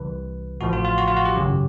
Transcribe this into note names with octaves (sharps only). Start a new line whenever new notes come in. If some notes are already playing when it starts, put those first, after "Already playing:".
Already playing: C2 C3 E3 B4
A1 A2 F3 F#4
F4
F4
F#4
F4
F#4
G4
G#1 F#2 C#3 F#3